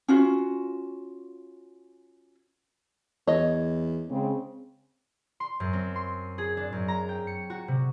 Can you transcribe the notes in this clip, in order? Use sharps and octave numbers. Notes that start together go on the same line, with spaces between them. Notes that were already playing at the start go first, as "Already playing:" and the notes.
C#4 F4 F#4
E2 C#5 D#5
C#3 G#3 C4
C6
F#2
C4
C6
G#4
D4
F#2
A#5
G5
C#7
F#4
C3